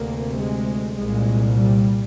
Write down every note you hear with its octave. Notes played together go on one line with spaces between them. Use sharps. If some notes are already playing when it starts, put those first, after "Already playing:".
Already playing: D2 C3 A#3
G#3
C2 A#2 G#3
G3